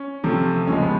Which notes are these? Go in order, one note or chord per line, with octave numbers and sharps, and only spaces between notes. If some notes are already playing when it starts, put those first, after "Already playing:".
Already playing: C#4
C3 F3 A3
C#3 F3 G#3 C#4
B3